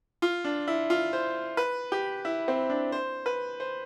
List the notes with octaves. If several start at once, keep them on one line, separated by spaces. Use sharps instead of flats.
F4
D4
E4
F4
C5
B4
G4
E4
C4
D4
C5
B4
C5